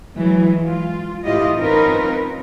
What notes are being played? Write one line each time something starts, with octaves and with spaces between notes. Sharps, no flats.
E3 F#3 G#3
F4
A2 E3 E4 F4 G4 D#5
C4 C#4 D#4 F4 A#4 B4